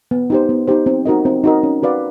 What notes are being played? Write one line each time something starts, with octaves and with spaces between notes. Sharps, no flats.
B3
D#4 G4 C5
B3
D#4 G4 C5
C4
D#4 F#4 A#4 D#5
C4
D#4 F#4 A#4 D#5
C#4
F#4 B4 D5 F5